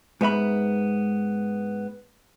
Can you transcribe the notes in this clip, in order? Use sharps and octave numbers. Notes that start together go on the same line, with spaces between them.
G#2 B3 E5 B5